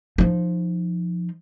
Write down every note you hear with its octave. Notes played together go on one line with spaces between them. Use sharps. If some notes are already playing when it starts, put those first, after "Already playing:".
F3 D#4